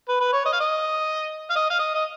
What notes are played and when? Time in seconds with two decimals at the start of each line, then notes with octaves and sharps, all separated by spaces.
0.09 B4
0.20 B4
0.33 C#5
0.45 D#5
0.53 F5
0.60 D#5
1.50 F5
1.55 D#5
1.70 F5
1.79 D#5
1.95 D#5